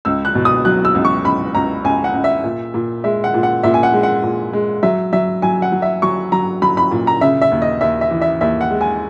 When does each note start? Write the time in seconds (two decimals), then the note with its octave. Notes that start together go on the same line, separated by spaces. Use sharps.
0.05 C#2 E6
0.25 F#6
0.35 B2
0.45 D#6
0.65 F#3 F#6
0.85 E6
0.95 C#2
1.05 C#6
1.25 C#2 B5
1.55 C#2 A#5
1.84 C#2 G#5
2.04 F#5
2.14 C#2
2.24 E5
2.44 A#2
2.74 A#2
3.04 G#3 E5
3.24 F#5
3.34 A#2
3.43 F#5
3.63 A#2 E5
3.74 G#5
3.83 F#5
3.93 G#3
4.03 F#5
4.23 A#2
4.53 G#3
4.83 F#3 E5
5.13 F#3 E5
5.42 F#3 G#5
5.62 F#5
5.72 F#3
5.82 E5
6.02 F#3 C#6
6.32 F#3 A#5
6.62 F#3 B5
6.77 B5
6.91 A#2
7.07 A#5
7.21 C#3 E5
7.41 E5
7.51 D#2
7.62 D#5
7.81 D#2 E5
8.01 E5
8.11 E3
8.21 E5
8.41 D#2 E5
8.61 F#5
8.70 G#3
8.81 G#5